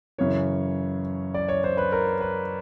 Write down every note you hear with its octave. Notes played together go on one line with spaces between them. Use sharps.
F#2 C#3 E3 C#5
D5
C#5
C5
B4
A#4
B4